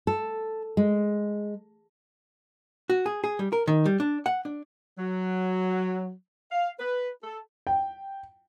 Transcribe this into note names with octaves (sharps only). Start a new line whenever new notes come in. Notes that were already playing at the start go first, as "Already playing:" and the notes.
A4
G#3
F#4
G#4
G#4
G3
A#4
D#3
G3
D4
F#5
D4
F#3
F5
B4
A4
G5